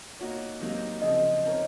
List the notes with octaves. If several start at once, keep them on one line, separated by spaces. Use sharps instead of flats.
A#3 D#4 F#4 C#5
C3 D#3 F#3 A#3 D#4
C#3 F3 C4 D#5
C4 D#4 A#4 C#5